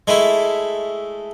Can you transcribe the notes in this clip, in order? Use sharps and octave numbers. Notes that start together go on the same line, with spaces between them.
G#3 A3 E4